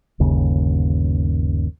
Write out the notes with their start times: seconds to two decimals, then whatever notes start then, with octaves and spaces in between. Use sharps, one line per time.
0.20 G1 D#2 C#3